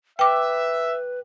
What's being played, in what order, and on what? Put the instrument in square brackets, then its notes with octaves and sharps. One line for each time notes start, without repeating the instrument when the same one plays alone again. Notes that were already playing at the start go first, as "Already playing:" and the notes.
[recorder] B4 [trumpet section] E5 [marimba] G5 D6